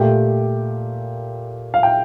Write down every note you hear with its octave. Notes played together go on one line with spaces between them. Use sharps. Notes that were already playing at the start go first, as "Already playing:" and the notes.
Already playing: A#2 A3 G4 G5
F5
G5